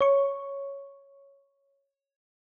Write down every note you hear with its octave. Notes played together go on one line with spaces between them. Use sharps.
C#5 C#6